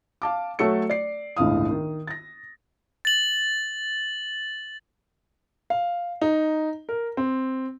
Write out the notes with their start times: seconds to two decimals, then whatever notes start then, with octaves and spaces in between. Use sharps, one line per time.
0.22 F5 A5 D6
0.59 F#3 A3 F#4 A4 C#5 C#7
0.90 D5 C7
1.36 G1 C#2 A2 E3 F5 D#6
1.71 D#3
2.07 A6 A#6
3.05 A6 F#7
5.70 F5
6.22 D#4
6.89 A#4
7.17 C4